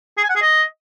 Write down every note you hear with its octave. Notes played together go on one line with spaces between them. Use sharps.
G#4
G#5
F#5
G#4
D#5